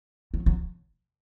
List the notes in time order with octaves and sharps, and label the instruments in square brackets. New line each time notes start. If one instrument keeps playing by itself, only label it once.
[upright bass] F#3
F#3